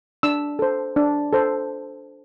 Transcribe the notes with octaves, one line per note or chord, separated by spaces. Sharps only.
D4 E6
A4 C5
D4
A4 C5